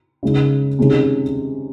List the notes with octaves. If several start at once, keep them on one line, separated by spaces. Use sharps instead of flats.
C#3 G#3 D#4
C3 D#3 G#3 C#4 G#4